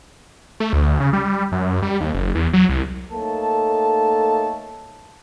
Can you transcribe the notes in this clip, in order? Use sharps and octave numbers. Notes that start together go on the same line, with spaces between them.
A3
D2
C#3
G3
F#2
G3
D#2
F#1
E2
F#3
C2
A3 A#3 D#4 A4 C#5 A5